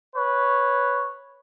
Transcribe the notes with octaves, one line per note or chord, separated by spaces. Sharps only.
B4 C#5